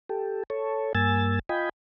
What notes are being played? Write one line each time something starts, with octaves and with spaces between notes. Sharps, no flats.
G4 A4
A4 C#5
G2 A#3 G#5 E6 A6
F4 D#5 G5 G#5 B5